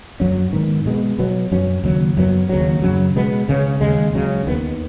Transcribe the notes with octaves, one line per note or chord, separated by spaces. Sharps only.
F#2 F#3 C#4
G#2 D#3 B3
B2 G#3 B3
B2 F#3 B3
F#2 F#3 C#4
D#2 C#3 F#3
F#2 F#3 B3
D#2 C#3 F#3
F#2 C#3 F#3
B2 G#3 B3
C#2 C#3 G#3 C#4
D#2 C#3 G#3
C#2 C#3 F#3
D#2 D#3 B3